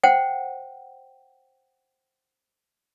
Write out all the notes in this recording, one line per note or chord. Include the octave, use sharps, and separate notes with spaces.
C5 F#5 G5